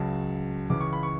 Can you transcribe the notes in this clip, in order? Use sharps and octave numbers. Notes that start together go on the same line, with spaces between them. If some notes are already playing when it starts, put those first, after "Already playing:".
Already playing: C#2 C#3 F#3 A5
C#2 C#3 E3 D6
C#6
B5
C#6